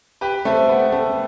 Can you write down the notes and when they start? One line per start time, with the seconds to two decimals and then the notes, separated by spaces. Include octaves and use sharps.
0.21 G4 B4
0.45 A3 C4
0.69 B3
0.92 A3